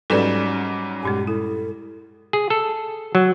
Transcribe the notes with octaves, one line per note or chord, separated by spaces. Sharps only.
G#2 F#3 G3 C#4 A4 B4 D5 E7
G2 A#2 G#3 G4
E4 A4
G#4
A4
F#3